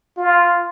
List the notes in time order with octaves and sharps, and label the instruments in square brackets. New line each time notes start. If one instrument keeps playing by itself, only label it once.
[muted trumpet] F4